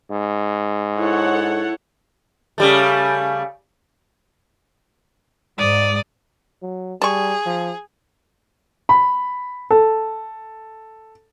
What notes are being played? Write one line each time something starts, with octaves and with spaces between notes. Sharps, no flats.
G#2
E4 A4 C#5 F#5
C#3 G3 A3
G#2 D5 D#6
F#3
G3 G#4 A5 C#6
F3
B5
A4